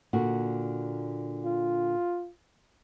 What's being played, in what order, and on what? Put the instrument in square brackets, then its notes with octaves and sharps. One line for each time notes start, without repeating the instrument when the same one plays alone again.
[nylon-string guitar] A#2 D3 F#4
[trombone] F4